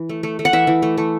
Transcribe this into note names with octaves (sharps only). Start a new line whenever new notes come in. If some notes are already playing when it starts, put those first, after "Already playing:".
Already playing: E3
A3
A3
A3
F#5
E3 E5
E3
A3
A3